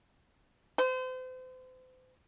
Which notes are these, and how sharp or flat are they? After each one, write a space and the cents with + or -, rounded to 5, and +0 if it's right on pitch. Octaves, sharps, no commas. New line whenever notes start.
C5 -35